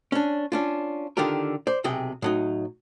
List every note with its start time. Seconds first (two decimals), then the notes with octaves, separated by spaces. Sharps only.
0.12 C#4 D4
0.52 C#4 D4 F4
1.17 D3 D#3 F4 G4 A#4
1.67 C5 D5
1.84 B1 C3 G#4 G5
2.22 A2 F#3 D#4